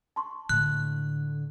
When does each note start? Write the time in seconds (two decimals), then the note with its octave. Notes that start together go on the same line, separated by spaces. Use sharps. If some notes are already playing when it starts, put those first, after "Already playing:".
0.16 A5 C6 C#6
0.49 A2 D3 G#3 F#6